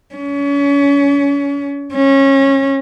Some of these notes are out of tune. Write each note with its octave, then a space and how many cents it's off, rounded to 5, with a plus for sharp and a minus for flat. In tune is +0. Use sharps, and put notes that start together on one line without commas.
C#4 +35
C#4 -25